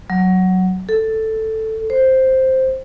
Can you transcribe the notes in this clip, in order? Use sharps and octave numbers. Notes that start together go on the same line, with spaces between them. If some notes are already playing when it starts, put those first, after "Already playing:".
F#3
A4
C5